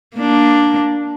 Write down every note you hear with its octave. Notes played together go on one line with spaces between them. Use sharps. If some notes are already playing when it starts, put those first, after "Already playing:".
A#3 D4